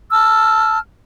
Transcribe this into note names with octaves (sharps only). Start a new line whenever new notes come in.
A5 E6 F6